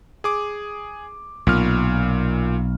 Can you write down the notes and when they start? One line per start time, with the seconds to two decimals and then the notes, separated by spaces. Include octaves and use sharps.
0.24 G#4 D6
1.47 B1 A#2 F6